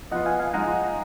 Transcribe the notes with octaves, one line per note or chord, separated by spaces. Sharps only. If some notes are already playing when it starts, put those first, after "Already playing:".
F3 B3 F4 D#5 F#5
F5 G#5
F5 G#5
F3 G#3 D#4 F#5 A#5